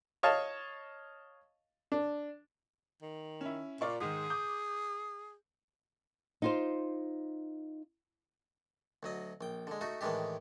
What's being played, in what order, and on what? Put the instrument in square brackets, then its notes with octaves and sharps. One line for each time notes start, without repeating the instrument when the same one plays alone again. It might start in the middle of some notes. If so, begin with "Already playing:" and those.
[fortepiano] C#5 D#5 F5 A5
D4
[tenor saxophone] D#3
[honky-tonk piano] C#4 E4
[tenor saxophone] A#2 [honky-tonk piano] F4 D5 C#6
[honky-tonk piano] G#2 D#3 [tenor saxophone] G#4
[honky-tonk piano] D6 D#6 G6
[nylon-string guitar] D#4 F4 C5
[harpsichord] D2 F#3 D#5
A#1 G5
D3 G#3
A3 D#4 F#4
A2 D#3 E3 G#3 D4 G4